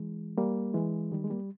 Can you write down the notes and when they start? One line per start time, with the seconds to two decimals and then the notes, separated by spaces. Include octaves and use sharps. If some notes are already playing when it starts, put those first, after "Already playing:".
Already playing: E3 G#3
0.37 G3 A#3
0.74 E3 G#3
1.12 D#3 G3
1.24 G#3
1.30 G3 A#3